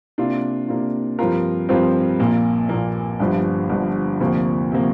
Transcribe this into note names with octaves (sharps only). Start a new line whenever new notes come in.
C3 A#3 D4 F4
C3 A#3 D4 F4
G2 F3 C4 F4 A#4
G2 F3 C4 F4 A#4
A#1 A#2 A#3
A#1 A#2 A#3
G1 G2 D3 F3
G1 G2 D3 F3
D2 C3 F3 A#3
C3 F3 A#3